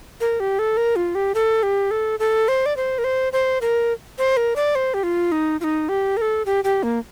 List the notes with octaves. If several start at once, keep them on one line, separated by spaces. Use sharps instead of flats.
A#4
G4
A4
A#4
F4
G4
A4
G4
A4
A4
C5
D5
C5
A#4
C5
C5
A#4
C5
A#4
D5
C5
G4
F4
D#4
F4
D#4
G4
A#4
A4
G4
G4
A#3